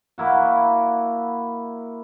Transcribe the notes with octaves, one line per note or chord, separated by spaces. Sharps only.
A#3 E4 F#4